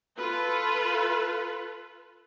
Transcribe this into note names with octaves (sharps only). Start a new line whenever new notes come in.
F4 A4 B4